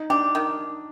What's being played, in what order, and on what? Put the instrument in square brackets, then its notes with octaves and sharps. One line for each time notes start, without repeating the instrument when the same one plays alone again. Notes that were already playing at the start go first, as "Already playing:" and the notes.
Already playing: [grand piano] D#4
[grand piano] D4 [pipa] G4
[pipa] D#3